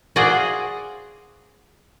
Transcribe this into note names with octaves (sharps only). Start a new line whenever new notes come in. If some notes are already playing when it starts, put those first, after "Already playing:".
F#4 G#4 C5 D5 F5 F#5